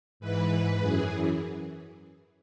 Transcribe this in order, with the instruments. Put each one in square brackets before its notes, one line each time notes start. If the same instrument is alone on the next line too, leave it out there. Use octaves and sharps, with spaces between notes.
[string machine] G#2 E3 B4
F#2 E3 G#4